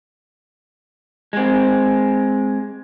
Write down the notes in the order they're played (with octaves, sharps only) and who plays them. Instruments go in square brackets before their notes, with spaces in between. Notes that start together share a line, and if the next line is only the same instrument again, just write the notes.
[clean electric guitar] G#3 C4